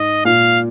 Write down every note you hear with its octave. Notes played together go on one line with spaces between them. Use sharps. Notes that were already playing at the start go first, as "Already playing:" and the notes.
Already playing: G#2 D#5
A#2 F5